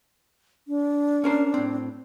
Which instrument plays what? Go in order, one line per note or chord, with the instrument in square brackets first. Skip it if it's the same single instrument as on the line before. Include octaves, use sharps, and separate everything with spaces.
[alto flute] D4
[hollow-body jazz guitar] C#4 A#4 C5
A2 C4